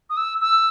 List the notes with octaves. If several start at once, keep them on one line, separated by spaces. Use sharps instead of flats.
D#6
E6
E6